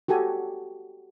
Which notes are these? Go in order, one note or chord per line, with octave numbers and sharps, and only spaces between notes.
F#4 G4 A4 G#5